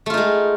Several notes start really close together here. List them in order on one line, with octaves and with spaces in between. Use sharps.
A3 F4 D#4 G#3